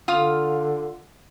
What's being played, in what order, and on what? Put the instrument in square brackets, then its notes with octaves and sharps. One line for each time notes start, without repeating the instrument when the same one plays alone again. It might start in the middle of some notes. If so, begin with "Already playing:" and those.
[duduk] D3 [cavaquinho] F4 F5 D#6